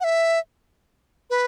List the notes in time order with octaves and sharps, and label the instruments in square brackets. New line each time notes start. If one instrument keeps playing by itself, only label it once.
[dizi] F#5
E5
B4